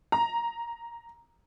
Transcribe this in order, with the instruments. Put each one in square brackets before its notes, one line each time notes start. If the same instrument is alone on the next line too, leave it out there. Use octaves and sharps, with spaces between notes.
[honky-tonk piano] A#5